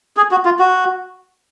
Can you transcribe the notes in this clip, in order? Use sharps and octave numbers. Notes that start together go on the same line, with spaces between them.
G#4
F#4
F4
F#4